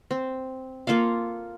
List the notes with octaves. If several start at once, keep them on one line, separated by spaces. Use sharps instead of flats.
C4
A#3 F4 A4 F5